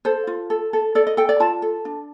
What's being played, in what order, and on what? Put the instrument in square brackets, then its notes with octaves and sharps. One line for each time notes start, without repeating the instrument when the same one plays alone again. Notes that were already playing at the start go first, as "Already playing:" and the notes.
[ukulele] A4 C5
F4
A4
A4
A4 D5
D#5
A4 G5
D5
F4 A5
A4
D4